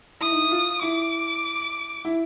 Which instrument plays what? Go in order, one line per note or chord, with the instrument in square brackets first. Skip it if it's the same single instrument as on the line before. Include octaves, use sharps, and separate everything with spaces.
[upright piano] E4 [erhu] D#6
[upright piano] D#4
E4
F4
[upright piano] E4 [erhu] D6
[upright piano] E4